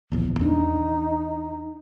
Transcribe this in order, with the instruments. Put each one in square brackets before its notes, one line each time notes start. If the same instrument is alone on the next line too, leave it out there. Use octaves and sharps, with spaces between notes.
[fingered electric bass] D1 A#1 E2
[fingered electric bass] E2 C4 D4 [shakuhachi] D#4